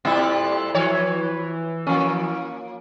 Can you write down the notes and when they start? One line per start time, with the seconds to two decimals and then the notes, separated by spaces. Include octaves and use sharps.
0.05 A2 G3 C4 E4 F4 A4 F#6
0.75 E3 F3 C#5
1.87 F3 A#3 C#4